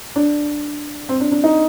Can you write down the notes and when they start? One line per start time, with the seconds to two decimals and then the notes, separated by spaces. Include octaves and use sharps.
0.16 D4
1.09 C4
1.20 D4
1.32 D4
1.44 D#4